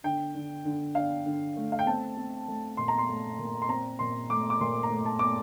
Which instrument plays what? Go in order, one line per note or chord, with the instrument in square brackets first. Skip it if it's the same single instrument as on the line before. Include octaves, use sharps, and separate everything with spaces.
[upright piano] D3 G5
D3
D3
D4 F5
D3
A3
F5
G5
C4 A5
C4
A3
A#2 C6
A#5
C6
A3
A#2
C6
C4 A#5
A#2 C6
A3 D6
D6
A#2 C6
A#5
A3
A5
A3 D6